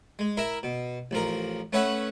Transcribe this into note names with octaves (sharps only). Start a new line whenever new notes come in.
G#3
E4 A#4 E5
B2
A1 F3 A#4
A3 C#4 B4 C#5 E5 F#5